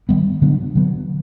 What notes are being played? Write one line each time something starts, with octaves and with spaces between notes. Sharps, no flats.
D#3 G3 B3
D3 F#3 B3 D4
D3 F#3 B3